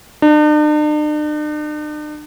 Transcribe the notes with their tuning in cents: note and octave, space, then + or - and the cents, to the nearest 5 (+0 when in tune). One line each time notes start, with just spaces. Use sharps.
D4 +45